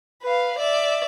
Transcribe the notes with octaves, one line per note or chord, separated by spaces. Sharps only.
B4 F5
D5 E5